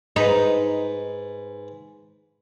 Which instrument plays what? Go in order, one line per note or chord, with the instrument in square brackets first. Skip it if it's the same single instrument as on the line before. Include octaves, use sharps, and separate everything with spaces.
[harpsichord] G#2 B4 [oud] D#4